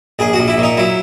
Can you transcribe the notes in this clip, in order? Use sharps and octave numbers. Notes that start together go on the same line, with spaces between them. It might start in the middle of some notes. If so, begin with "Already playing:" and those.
A#1 G#4
A#1 F#4
E4
A#2
D#4
F#3 E4